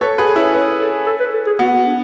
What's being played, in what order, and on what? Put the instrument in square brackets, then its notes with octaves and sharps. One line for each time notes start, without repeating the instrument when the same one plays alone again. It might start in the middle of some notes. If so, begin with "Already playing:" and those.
[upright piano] A4 C#5 [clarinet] B4
[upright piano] G#4 B4
[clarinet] A4
[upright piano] C#4 E4
[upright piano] C#4 [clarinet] B4
[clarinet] A4
A4
B4
A4
G#4
[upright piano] B3 [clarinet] F#4
[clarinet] D4